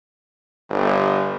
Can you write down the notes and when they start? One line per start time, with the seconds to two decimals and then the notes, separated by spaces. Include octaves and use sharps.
0.70 G1